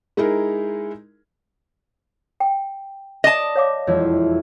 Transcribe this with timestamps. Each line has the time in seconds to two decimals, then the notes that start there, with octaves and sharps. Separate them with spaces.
0.17 G#3 D#4 E4 G#4 A#4
2.40 G5
3.24 D5 D#5 A5
3.55 C#5 F5 D6
3.87 E1 F2 E4 C#5